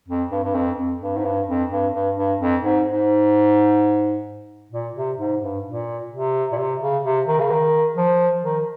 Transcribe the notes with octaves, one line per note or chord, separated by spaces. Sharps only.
F2
G2
G2
F2
F2
G2
G#2
G2
F2
G2
G2
G2
F2
G#2
G#2
A#2
C3
G#2
G2
A#2
C3
A#2
C3
C#3
C3
D#3
C#3
D#3
F3
D#3